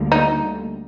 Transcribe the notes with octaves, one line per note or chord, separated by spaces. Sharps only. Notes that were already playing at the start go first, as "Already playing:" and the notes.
Already playing: D2 D3 G3 A#3
D#4